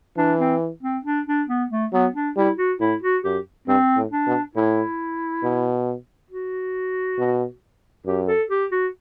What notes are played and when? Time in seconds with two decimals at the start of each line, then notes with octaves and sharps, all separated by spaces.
0.17 E3 D4
0.40 C4
0.83 C4
1.05 D4
1.28 D4
1.49 B3
1.71 A3
1.92 F#3 B3
2.15 D4
2.36 G3 E4
2.58 F#4
2.80 A2 E4
3.02 F#4
3.24 F#2 G4
3.68 G2 C4
3.96 A2
4.11 D4
4.27 B2
4.55 A2 E4
5.43 B2
6.31 F#4
7.18 B2
8.06 F#2 G4
8.28 A4
8.50 G4
8.72 F#4